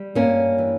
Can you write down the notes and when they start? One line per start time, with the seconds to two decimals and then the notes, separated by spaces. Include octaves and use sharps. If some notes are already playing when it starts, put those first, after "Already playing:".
Already playing: G3
0.15 G2 A#3 C#4
0.58 E3